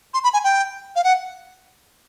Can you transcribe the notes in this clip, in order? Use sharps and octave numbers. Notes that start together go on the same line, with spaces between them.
C6
B5
G#5
G5
F5
F#5